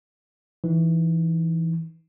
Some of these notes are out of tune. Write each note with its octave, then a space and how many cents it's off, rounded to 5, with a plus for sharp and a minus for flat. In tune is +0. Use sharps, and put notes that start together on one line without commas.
E3 +0 D#4 +0